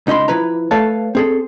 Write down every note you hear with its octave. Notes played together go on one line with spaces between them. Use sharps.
C#2 D#4 D#5 B5 C6
F3 E4 B4 A#5
A3 A4 B4 C#5 F5 A5
C4 G#4 A4